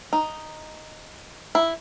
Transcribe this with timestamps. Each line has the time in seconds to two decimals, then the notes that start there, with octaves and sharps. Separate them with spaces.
0.13 D#4
1.55 E4